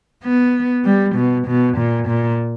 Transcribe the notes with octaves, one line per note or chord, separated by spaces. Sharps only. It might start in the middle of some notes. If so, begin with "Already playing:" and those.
B3
G3
B2
B2
A#2
A#2